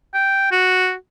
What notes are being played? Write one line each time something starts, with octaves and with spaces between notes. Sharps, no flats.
G5
F#4